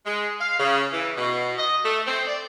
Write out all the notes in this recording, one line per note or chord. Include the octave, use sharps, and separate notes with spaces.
G#3
F5
C#3
E3
B2
D#5
A3
C4
D5